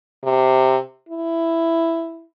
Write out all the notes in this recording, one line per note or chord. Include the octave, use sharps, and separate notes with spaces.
C3
E4